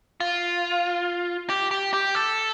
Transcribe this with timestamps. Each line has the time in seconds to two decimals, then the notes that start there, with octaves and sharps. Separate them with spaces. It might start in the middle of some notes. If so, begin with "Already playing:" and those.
0.20 F4
1.50 G4
1.71 G4
1.94 G4
2.15 A4